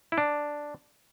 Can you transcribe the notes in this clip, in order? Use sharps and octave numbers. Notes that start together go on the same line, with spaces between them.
E4
D4